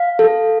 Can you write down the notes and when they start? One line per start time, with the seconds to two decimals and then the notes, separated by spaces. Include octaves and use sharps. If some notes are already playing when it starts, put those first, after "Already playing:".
Already playing: F5
0.19 A4